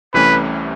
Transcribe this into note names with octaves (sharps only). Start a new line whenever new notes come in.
C2 C3 E3 A3 C#4 B4